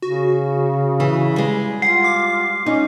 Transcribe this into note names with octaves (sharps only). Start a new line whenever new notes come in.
C#3 F#4
E3
G3 G#3
F4 F#5 C7
D6
C#4 D#4